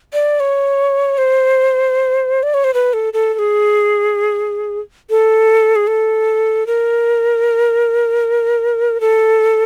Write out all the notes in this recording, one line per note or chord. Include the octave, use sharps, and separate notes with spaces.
D5
C#5
C5
D5
C#5
C5
B4
A4
A4
A4
G#4
A4
G#4
A4
A#4
A4